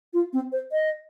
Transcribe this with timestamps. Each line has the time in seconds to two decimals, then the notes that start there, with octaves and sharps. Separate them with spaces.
0.13 F4
0.33 C4
0.52 C5
0.72 D#5